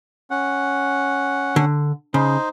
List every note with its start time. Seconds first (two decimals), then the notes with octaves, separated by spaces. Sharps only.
0.31 C#4 F#5
1.56 D3
2.14 C#3 D#4 C5